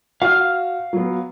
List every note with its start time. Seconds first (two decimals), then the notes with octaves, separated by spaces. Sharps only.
0.22 F#4 F5 F6
0.93 F#3 B3